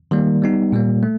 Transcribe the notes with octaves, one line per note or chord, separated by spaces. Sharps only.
D#3 G3 A#3
G3 B3 D#4
A#2 G3 A#3
A3